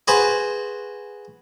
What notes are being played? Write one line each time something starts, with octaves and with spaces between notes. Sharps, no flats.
F#4 G#4 B4 C5 G#5